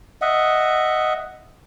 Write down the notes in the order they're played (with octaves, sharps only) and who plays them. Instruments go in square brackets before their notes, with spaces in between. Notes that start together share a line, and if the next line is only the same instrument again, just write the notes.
[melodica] D#5 E5 F#5